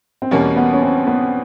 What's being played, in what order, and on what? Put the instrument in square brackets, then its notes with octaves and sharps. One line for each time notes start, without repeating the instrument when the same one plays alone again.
[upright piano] C4
[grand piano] E2 B2 G3 A#3 [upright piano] C#4
[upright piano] B3
C#4
C4
B3